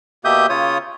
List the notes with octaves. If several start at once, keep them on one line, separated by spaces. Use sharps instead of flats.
B2 A#3 G4 E5 D#6 G6
C#3 F4 C#5 D#6